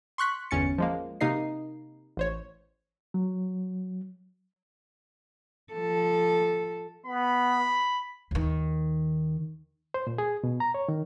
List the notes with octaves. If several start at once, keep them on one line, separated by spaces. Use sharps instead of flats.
C6 C#6 F#6 B6
G1 E2 C#4 A6 C#7
F3 G#3 A#3
C3 A#3 D#4 D#5 C7
A1 C5 C#5
F#3
F3 A4
B3 B5
D#2 D#3
C5
A#2
G#4
B2
A#5
C#5
D#3